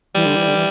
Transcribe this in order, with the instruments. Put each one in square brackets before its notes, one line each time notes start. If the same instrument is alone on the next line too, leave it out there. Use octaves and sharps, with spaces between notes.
[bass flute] E3 [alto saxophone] G3
[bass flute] D3
E3
D3
E3